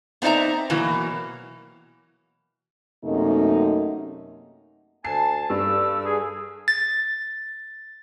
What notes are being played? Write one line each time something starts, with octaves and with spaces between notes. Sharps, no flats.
B3 C4 D#4 D5 E5 A#5
B2 E3 F#3 A#3
F#2 C3 A3 A#3 D#4
D2 G#5 A5 C7
G2 A4 A5 E6
G#4
A6